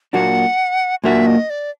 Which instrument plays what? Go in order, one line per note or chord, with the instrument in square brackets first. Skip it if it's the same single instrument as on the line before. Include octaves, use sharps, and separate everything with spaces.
[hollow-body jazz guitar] A#2 F#3 A#3 D4 F#4 [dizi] F#5
[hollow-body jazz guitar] A#2 F#3 A#3 D4 F#4 [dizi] E5
[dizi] D#5
D5